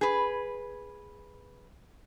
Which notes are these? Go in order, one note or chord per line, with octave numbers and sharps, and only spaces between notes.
G#4 B4